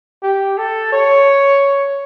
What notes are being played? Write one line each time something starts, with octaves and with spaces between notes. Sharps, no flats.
G4
A4
C#5